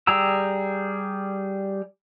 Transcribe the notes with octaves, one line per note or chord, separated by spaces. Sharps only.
G3 G#4 G5 A#5 E6